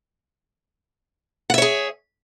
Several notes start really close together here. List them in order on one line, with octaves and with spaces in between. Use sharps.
F#5 E5 C#5 G#4